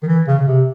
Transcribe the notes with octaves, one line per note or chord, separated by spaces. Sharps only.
D#3
E3
C#3
C#3
C3